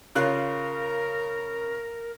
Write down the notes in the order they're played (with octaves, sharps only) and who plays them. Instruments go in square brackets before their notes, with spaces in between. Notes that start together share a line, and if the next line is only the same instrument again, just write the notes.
[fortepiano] C#3 F4 F#6 [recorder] A#4